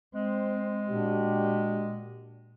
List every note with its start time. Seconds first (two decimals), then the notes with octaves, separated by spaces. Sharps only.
0.15 G#3 C4
0.88 A#2 D4 F#4 G4